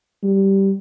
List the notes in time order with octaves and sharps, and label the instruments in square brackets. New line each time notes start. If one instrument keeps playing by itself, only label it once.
[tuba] G3